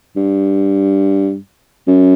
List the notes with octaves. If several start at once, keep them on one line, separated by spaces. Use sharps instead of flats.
G2
F#2